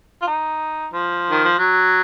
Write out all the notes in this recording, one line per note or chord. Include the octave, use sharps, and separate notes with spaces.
F4
D#4
F3
D#3
F3
F#3